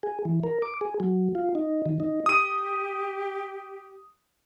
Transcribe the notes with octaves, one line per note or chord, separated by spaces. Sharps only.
G#4
E3
A#4
D6
G#4
F#3
F4
D#4
D#3
D#4
G4 D#6 D#7